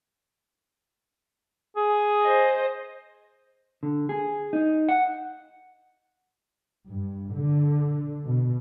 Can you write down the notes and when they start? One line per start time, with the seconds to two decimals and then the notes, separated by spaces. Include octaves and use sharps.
1.77 G#4
2.22 C5 D#5
3.83 D3
4.09 G#4
4.53 D#4
4.89 F#5
6.90 G2
7.35 D3
8.25 B2